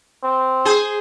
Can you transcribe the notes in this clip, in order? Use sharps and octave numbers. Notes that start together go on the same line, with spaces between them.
C4
G#4 C5